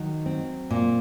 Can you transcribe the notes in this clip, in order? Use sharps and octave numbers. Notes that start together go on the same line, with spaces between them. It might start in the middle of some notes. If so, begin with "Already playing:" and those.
Already playing: D#3 F#3
C4
A#2